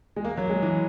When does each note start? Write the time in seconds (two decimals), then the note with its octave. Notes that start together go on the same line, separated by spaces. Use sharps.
0.16 G#3
0.25 A#3
0.37 F#3
0.49 G#3
0.62 E3